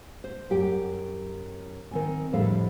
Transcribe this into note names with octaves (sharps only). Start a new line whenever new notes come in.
C5
F#2 G4 G5
D#3 C4 G#5
F2 A2 D3 G3 A4 F5